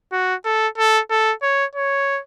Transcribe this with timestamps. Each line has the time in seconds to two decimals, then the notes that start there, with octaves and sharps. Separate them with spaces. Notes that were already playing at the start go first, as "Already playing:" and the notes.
0.12 F#4
0.45 A4
0.78 A4
1.11 A4
1.43 C#5
1.75 C#5